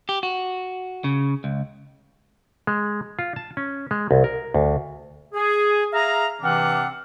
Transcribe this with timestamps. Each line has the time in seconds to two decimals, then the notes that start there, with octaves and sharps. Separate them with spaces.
0.09 G4
0.23 F#4
1.04 C#3
1.44 C#2
2.67 G#3
3.19 F4
3.36 A5
3.57 C#4
3.91 G#3
4.11 C2
4.24 A#4
4.54 D2
5.33 G#4
5.93 G#4 E5 F5 A#5
6.42 C3 E3 C4 D4 F5 F#5